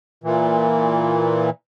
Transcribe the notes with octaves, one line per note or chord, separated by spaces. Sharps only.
A#2 E3